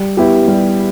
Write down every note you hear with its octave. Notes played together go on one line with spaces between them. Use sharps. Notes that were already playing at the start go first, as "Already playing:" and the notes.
Already playing: G3
B3 E4 G4
G3